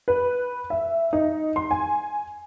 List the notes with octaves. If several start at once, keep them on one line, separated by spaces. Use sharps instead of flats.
B4
E5
D#4
C6
G#5